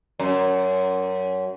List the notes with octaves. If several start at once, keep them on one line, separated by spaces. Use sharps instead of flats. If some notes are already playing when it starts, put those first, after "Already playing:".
F#2